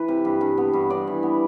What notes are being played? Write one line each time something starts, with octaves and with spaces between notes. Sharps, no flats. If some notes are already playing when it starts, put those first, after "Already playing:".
Already playing: E3 B4
C3
G2
G2
B3
G2
G2 D5
E3
B3